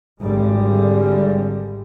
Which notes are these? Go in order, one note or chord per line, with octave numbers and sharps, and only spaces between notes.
G#1 D3 G3 G#3